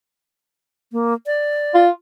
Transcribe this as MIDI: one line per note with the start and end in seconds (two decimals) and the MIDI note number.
0.92 1.14 58
1.26 1.84 74
1.75 1.90 65